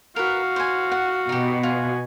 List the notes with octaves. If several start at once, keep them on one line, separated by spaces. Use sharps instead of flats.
F#4 A#4 B4 F5
C5 G#5
F#5
B2 D#4 G4
F4 G#5